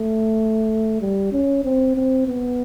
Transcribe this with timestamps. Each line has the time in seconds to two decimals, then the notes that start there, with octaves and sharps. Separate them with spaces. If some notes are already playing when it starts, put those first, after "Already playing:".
Already playing: A3
1.01 G3
1.32 C#4
1.64 C4
1.96 C4
2.28 B3